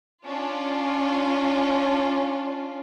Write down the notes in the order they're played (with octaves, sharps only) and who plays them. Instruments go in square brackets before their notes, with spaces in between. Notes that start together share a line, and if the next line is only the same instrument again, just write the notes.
[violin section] C#4 D4 F4